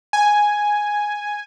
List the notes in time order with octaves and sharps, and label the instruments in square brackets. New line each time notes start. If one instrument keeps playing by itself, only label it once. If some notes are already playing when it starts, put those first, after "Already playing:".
[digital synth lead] G#5